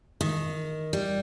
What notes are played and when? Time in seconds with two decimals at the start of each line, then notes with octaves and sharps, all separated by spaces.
0.21 D#3
0.93 G3